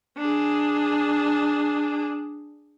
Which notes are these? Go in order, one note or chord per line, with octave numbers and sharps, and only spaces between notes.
D4 G#4